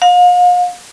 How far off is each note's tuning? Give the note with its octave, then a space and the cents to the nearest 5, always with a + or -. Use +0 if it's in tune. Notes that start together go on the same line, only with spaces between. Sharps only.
F5 +40